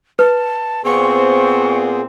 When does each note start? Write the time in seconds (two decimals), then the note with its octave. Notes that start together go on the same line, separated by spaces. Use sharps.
0.19 B4 A5
0.85 A#2 B3 C4 G#4 C#6